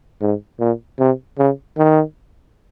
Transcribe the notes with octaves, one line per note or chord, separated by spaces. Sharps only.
G#2
A#2
C3
C#3
D#3